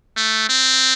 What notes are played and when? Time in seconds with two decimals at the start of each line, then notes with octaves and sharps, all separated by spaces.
0.16 A3
0.49 C4